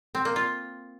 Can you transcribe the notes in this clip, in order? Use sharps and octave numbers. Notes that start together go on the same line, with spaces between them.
C4
A#3
F4